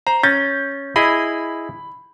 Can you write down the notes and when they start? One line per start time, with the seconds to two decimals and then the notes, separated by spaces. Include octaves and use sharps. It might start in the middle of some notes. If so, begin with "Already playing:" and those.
0.07 C5 A#5
0.23 C#4 G6 A6
0.96 E4 G#4 D#5 B5